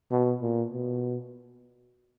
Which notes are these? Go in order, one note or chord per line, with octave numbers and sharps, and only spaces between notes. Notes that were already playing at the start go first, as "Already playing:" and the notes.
B2
A#2
B2